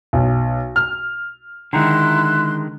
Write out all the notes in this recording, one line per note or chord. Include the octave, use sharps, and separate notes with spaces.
B1
F6
D3 D#3 G#3 E4 A#5 C6 F#6